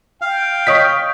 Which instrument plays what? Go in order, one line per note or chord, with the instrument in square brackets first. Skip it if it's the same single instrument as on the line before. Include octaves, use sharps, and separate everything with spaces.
[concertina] F5 [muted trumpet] G5
[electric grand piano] C#5 D#5 B6 [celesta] C#6 D#6 D7